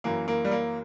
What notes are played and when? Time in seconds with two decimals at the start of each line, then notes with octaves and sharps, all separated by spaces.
0.04 F#2 E3 A#3
0.28 A#3
0.45 G3
0.51 A#3